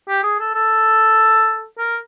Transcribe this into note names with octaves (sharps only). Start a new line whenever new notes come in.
G4
G#4
A4
A4
A#4